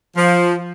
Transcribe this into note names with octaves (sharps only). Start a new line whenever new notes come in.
F3